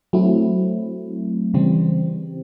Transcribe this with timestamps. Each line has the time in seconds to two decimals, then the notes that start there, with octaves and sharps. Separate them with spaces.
0.13 F#3 A3 C4 E4
1.54 C#3 E3 G3 C4